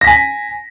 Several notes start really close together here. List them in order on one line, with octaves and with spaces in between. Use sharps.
A#6 B6 G#5